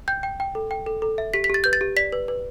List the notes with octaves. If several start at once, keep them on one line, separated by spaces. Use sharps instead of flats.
G5 G6
G5
G5
A4
G5
A4
A4
E5
G4 B6
B6
G4 A6
B4 G6
A6
G4
D5 B6
B4
B4